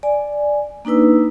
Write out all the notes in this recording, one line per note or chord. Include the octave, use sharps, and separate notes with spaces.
D5 G#5
A#3 D4 D#4 B4 E6